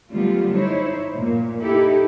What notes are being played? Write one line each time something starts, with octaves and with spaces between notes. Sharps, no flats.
D3 F#3 G3 A3 B3 F4
D#4 E4 C5 C#5
A#2
D#4 E4 G4 A4